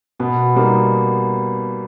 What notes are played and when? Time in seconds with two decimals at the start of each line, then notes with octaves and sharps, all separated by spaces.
0.19 B2 B3
0.55 G3 A#3 D#4